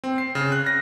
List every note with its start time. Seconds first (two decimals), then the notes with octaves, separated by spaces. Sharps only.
0.04 C4
0.18 C7
0.35 C#3
0.52 F#6
0.66 A#6